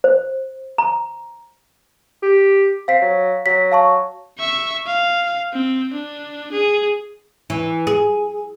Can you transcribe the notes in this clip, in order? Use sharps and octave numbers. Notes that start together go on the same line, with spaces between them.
C5
A#5
G4
C4 F5 B6
F#3
F#3 B6
F5 A5 C#6
E5 C#6
F5
C4
D4
G#4
E3
G#4